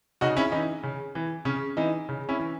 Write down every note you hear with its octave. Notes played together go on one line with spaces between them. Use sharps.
C#3 D#4 F#4
C#4 E4
E3 D#4
C#3
E3
C#3 C#4
E3 D#4
C#3
C#4 E4
E3